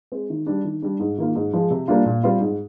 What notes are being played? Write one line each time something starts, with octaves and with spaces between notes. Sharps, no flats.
G#3 C4
D#3
G3 D4
D#3
G3 D4
G#2
D#3 A#3 F4
G#2
F3 G#3
C3
G3 A#3 D4 F4
A#2
G3 C4 F4
G#2